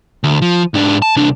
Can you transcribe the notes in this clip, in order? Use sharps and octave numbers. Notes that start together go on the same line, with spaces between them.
D2
F3
G#2 D4
A5
C2 D4